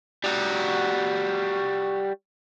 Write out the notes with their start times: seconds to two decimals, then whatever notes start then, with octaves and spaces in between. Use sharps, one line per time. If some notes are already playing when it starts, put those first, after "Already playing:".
0.24 G3 F#4